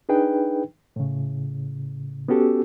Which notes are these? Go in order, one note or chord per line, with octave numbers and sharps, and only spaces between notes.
D4 D#4 G#4 B4 G5
A2 C#3
B3 C#4 F#4 G4 A4